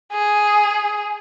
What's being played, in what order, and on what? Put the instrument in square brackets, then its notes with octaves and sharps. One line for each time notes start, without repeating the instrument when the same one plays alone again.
[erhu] G#4